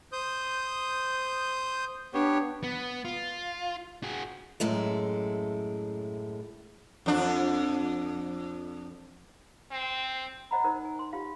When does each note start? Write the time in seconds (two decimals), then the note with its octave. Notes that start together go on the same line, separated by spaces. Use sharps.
0.12 C5 D#6 G6
2.14 B3 D4 G4 C#5
2.64 B3
3.05 F4
4.03 F#4 G#4
4.60 F#2 A2 G#3 A4
7.06 F2 D4
9.71 C4
10.51 C5 D#5 F#5 A#5 B5
10.64 D#4 A#4 C5
10.85 G#5
10.99 C6
11.13 F4 G4 F5